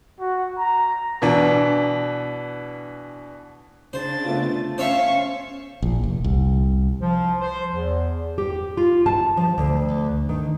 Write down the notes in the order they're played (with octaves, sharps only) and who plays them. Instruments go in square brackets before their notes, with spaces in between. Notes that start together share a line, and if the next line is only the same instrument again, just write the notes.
[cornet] F#4
A#5
[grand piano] B2 E3 D4
[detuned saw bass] C#3 [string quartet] D4 A6 [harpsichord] C5
[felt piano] A3 B3 F4
[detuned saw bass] C#4 [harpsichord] C5 C#5 E5 [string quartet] F5 C#6
[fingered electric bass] A#1
F1
C2
[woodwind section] F3
C5
E2
[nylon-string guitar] G4
F4
A5
F3
D2
D#3